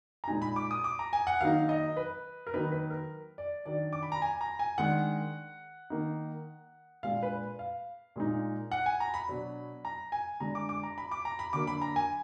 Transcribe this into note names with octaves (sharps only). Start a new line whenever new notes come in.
A#5
A#2 G#3 D#4 G#5
B5
D6
D#6
D6
A#5
G#5
F#5
D#3 F#3 A#3 D#4 F5
D#5
B4
A#4
D#3 F#3 A#3 D#4 B4
B4
A#4
D5
D#3 F#3 D4 D5
D6
B5
A#5
G#5
A#5
G#5
D#3 G#3 D4 F#5
D#3 A#3 D#4
A#2 G#3 D4 F5
B4
F5
A#2 G#3 D#4
F#5
G#5
A#5
B5
B2 F#3 D4
A#5
G#5
D3 G#3 D4 A#5
D6
D6
A#5
B5
D6
A#5
B5
D3 F#3 A#3 D6
B5
A#5
G#5